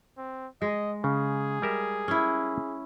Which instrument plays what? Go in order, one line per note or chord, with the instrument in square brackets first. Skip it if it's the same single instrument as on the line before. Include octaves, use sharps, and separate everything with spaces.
[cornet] C4
[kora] G#3 [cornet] D#5
[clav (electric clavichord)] C#3 [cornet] G#4
[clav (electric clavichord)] G3 A#4 E5
[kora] C#4 E4